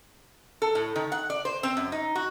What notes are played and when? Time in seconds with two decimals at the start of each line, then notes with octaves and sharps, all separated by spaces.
0.62 A4
0.75 A2
0.96 D#3
1.12 F#5
1.30 D5
1.45 C5
1.63 C4
1.77 F#2
1.92 D#4
2.15 F#4